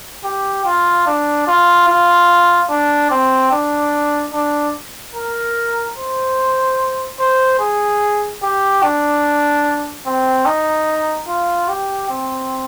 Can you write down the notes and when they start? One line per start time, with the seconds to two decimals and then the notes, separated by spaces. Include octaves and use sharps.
0.24 G4
0.65 F4
1.07 D4
1.48 F4
1.88 F4
2.70 D4
3.11 C4
3.52 D4
4.33 D4
5.15 A#4
5.97 C5
7.20 C5
7.60 G#4
8.43 G4
8.83 D4
10.06 C4
10.46 D#4
11.28 F4
11.69 G4
12.10 C4